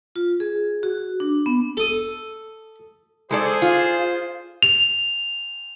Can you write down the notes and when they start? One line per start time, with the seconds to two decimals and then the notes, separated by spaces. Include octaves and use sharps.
0.16 F4
0.40 G#4
0.83 F#4
1.20 D4
1.46 B3
1.77 A4 D#6
3.31 G#3 G#4 A4 C5 D5
3.62 F4
4.63 F7